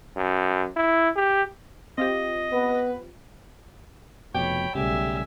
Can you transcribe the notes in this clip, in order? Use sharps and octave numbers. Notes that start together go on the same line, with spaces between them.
F#2
E4
G4
C4 F4 G4 D#5
B3 B4
F1 F2 B2 C#5 G5 B5
B1 C#3 G3 A3 G4 E5 G#5